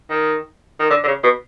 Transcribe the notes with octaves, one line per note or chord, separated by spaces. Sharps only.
D#3
D#3
D3
D3
C#3
B2